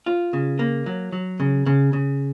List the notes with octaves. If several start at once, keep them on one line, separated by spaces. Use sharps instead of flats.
F4
C#3
A#3
F#3
F#3
C#3
C#3
C#3